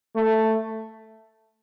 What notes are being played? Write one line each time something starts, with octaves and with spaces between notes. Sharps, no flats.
A3